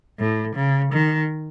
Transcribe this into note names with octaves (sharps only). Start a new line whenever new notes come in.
A2
C#3
D#3